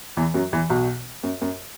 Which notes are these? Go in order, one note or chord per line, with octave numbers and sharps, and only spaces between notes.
E2 E3
F#2 F#3
E2 E3
B1 B2
F#2
F#2